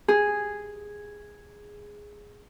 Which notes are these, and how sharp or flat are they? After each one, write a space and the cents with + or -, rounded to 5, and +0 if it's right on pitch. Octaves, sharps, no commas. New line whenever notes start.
G#4 -5